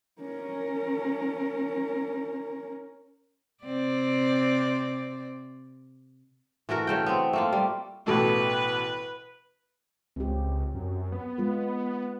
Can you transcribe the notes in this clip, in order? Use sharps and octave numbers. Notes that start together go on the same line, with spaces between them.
C#4 A#4
C3 C4 D5
E3 A3 F#4 A#4
C#3 A3 G5
B3 C4
A3 A#3 F4
G3
A1 B2 A3 B4
C#2 C4 G4
F#2
B3
G#3 F4 B4